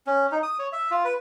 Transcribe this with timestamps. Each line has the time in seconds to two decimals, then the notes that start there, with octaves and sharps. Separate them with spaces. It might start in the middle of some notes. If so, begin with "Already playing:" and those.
0.07 C#4
0.32 D#4
0.43 D#6
0.59 C#5
0.72 E5
0.91 F4
1.04 B4